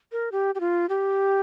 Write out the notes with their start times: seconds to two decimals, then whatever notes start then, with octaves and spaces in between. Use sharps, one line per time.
0.12 A#4
0.32 G4
0.55 G4
0.60 F4
0.89 G4